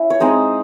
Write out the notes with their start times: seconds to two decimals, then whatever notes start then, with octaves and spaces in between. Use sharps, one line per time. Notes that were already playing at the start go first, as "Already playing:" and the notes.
Already playing: C#4 E4 E5
0.10 C#5
0.20 G#3 C4 D#4 C5